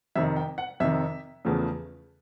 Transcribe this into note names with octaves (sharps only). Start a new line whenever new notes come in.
F2 C3 D#3 E5
G5
F#5
F2 C3 D#3 E5
E2 C#3 F3 A3